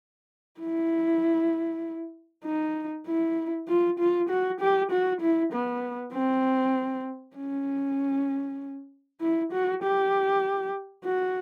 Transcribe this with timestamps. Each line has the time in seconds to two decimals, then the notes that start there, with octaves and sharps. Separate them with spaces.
0.61 E4
2.45 D#4
3.07 E4
3.69 F4
3.99 F4
4.29 F#4
4.61 G4
4.92 F#4
5.21 E4
5.53 B3
6.13 C4
7.37 C#4
9.21 E4
9.53 F#4
9.83 G4
11.05 F#4